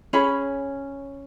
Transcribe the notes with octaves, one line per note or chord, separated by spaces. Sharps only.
C#4 G#4 B5